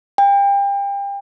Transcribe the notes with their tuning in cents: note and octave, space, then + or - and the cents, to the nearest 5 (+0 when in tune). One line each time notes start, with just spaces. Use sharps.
G5 +35